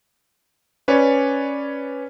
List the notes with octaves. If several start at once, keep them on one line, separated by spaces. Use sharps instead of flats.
C#4 B4 C#5 D5